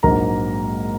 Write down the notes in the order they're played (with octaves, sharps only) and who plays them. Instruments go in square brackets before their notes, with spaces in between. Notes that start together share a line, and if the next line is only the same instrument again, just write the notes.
[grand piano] A#1 G#2 F#3 A#3 A#4 A#5